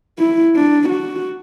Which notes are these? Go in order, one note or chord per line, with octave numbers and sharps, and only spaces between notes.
E4
D4
F#4